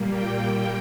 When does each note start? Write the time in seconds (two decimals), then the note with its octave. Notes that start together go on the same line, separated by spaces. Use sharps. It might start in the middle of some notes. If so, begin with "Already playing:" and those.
Already playing: A#2 G3 A#3
0.11 G5